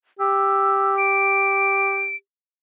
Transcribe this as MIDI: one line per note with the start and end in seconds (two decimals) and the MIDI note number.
0.19 2.15 67
0.19 0.95 88
0.98 2.16 98